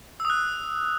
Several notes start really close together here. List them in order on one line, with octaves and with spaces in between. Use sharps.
E6 D#6 F#6